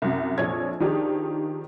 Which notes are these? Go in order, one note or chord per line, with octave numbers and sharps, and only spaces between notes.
C2 F#2
A#1 F2 C#5 D5 G#6
D#3 F3 D4 D#4 G4 G#4